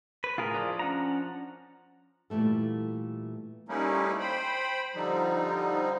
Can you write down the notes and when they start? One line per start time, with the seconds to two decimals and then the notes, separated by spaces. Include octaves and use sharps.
0.24 B4
0.38 A2 F4 G#4 A#4
0.54 F3 D4
0.79 C#4 F#5 A#5
2.30 A#2 E3 G3 A3 A4
3.69 G3 A3 A#3 C#4 D#4 E4
4.20 C5 G5 B5
4.95 D3 F3 G3 D#4